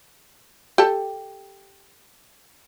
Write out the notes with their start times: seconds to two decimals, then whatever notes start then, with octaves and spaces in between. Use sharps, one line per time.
0.78 G4 A4